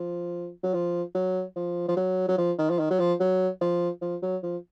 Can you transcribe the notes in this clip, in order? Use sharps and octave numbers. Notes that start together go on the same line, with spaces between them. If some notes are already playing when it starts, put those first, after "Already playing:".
Already playing: F3
F#3
F3
F#3
F3
F3
F#3
F#3
F3
D#3
F3
D#3
F#3
F3
F#3
F3
F3
F#3
F3